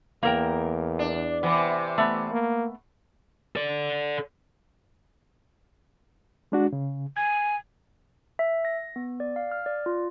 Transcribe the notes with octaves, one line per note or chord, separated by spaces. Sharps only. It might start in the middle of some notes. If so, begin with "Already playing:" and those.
E2 A#3 A#4 G5
D4
C3 E3 B3
A3 B3
A#3
A4 D5
G#3 D4 F#4
C#3
G#5 G#6
E5
A#6
B3
D5
F5
F6
D5
F4